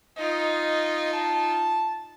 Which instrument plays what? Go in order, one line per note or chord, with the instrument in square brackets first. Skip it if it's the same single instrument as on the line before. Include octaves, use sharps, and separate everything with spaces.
[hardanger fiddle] D#4 F4 [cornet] D#5
[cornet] A5